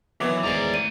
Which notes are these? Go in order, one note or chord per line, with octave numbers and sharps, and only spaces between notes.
D#3 E3 F#3 B3 C#5 D6
E2 G#2 D#3 A3 D5 A#5
D#7